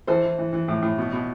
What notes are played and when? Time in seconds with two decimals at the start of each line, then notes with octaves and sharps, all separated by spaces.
0.07 E3 A4 C5
0.23 E3
0.38 E3
0.53 E3
0.68 A2
0.82 A2
0.98 B2
1.13 B2